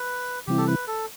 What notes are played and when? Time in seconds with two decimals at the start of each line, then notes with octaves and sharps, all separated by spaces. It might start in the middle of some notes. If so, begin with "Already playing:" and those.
Already playing: B4
0.47 C3 E3 G3 C4 E4 G4
0.58 A4
0.67 B4
0.88 A4